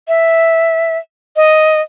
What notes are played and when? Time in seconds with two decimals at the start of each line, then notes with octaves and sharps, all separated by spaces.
0.08 E5
1.36 D#5